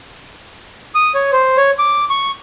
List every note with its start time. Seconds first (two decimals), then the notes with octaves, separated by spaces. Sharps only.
0.95 D#6
1.15 C#5
1.33 C5
1.57 C#5
1.79 D6
2.10 C#6